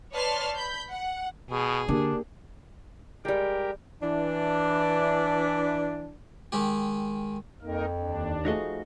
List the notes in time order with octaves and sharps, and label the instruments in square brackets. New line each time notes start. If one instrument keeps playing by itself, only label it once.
[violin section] B4 C#5 D5 A5 C6 F6
B5 G6
F#5
[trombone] B2 [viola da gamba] G#4
[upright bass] D3 [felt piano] A#3 G4 [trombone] D4
[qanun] G3 G#3 [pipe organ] G4 A#4 G5
[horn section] E3 D4
[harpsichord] D#3 G#3 G4
[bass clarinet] F2 [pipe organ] A#3 D#4 A#4
[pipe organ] D#2 D4
[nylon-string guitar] F3 A3 G#4 [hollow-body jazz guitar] D#4 F#4 D#5